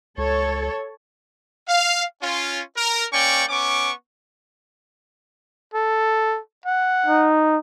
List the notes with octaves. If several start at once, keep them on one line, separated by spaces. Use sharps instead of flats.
C#2 A4 C#5
F5
C#4 F4
A#4
A#3 C#4 D5 G5 C#6
B3 C#4 C#6 D6
A4
F#5
D#4